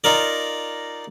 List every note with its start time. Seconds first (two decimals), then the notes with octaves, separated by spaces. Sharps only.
0.04 D#4 F4 A#4 D5